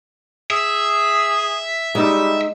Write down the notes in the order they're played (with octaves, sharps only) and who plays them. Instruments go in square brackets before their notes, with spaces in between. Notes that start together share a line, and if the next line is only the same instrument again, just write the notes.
[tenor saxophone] G#4 [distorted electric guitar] E5
[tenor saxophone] G3 [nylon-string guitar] G#3 D#4